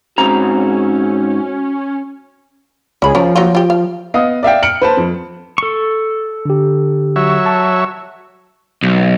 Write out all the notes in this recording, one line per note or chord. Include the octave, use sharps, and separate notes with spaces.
G#2 C4 C#4 F#4 A#5
C#2 C#4 G#4 B5
F3 C#4 F4 A#4
F#3 A#3 F4
F4 G4
F5
B3 D#5 F5 D#6
D5 E5 F5 G5
F6 C#7 D7 F#7
B4 C5 A5
F2
A4 C#6
D3 G4
F#3 C#5 E5
A5
B1